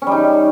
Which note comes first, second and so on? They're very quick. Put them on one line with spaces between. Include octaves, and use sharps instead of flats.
C#4 G3 D#4